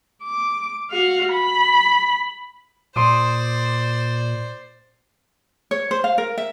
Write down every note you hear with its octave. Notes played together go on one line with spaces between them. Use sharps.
D6
F#4 F5
B5
A#2 C5 D5 C6 D6 D#6
C#5
C5
F5
A#4
E5